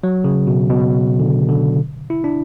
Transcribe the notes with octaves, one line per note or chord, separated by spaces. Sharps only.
F#3
C#3
B2
B2
D3
D3
E4
D4